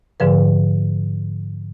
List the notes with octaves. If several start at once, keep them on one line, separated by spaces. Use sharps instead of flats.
G#2 D3 F3 B4